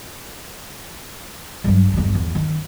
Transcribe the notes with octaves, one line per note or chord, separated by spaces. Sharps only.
G2 F#3
G1 D#2
E2
D#3